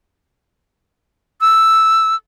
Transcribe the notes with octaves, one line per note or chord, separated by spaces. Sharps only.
E6